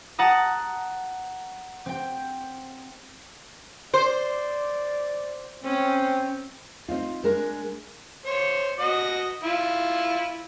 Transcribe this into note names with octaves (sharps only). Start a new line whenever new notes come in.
F#5 A5 A#5 D#6
C4 G5
C5 D5
C4 C#4
C4 D#4 F4
G#3 D4 A#4
C5 C#5
F#4 D#5
E4 F4